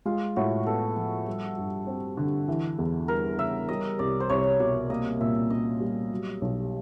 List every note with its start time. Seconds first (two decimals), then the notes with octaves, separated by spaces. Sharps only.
0.05 G#3 F4
0.36 A2 F#4
0.66 B3 A4
0.96 F3
1.26 G3
1.58 G2
1.87 C4
2.17 D3
2.48 E3
2.79 E2
3.08 G3 A#4
3.38 C#3 E5
3.68 G3 D#5
3.99 C2 D5
4.20 C5
4.29 C2 C#5
4.60 B2 D5
4.90 A#3 D#5
5.21 A#2 E5
5.50 C#4 D#5
5.80 G3
6.12 F#3
6.41 B1